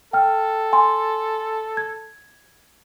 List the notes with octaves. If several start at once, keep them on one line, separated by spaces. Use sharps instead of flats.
A4 G5 F6
G#5 C6
G#6